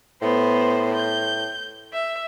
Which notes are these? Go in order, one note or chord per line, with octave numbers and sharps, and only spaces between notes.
A2 B3 C5
G6
E5